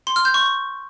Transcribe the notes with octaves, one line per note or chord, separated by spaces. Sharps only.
C6
F6
G6
C#6